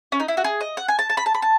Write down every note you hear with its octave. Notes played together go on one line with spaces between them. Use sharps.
C#4
D#4
E4
F#4
G#4
D#5
F#5
G#5
A5
A5
B5
A5
B5
A5